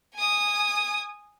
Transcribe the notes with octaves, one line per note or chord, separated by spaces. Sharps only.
G#5 D#6